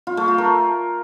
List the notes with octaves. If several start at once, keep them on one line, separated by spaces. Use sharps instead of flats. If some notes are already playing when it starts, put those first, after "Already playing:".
F4
A3
F4
A#4